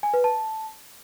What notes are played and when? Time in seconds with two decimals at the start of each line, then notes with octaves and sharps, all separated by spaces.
0.03 G#5
0.14 B4
0.24 A5